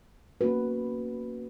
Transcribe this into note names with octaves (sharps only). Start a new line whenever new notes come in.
A#3 C#4 F#4 B4